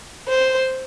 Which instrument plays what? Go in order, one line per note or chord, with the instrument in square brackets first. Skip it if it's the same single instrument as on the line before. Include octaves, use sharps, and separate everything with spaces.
[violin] C5